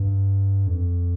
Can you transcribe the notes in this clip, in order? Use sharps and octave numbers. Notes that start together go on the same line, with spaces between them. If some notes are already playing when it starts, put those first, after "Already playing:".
Already playing: G2
F2